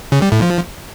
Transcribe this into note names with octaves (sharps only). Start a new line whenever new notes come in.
C#3
G3
A2
F3